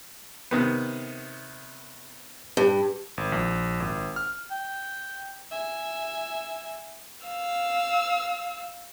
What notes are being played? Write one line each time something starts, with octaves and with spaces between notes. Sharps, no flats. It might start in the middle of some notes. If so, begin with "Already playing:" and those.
C3 D#3 B3
G2
G#1
A#1
G#1
F6
G5
E5 G#5
F5 E6